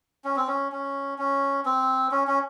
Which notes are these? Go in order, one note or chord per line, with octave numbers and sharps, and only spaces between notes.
C#4
C4
C#4
C#4
C#4
C4
C#4
C#4